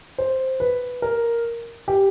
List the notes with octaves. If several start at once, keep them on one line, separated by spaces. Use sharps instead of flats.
C5
B4
A#4
G4